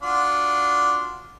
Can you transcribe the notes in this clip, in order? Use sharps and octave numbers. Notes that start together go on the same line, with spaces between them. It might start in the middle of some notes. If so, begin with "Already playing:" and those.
D4 F4 F#4